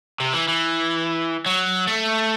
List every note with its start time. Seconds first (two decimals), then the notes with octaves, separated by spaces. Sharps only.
0.20 C3
0.33 E3
0.48 E3
1.46 F#3
1.87 A3